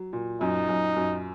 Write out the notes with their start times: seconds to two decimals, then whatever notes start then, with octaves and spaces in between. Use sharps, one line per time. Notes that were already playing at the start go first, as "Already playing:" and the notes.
Already playing: F#3
0.13 A#2
0.41 F#2 D#4
0.69 F#2
0.97 F#2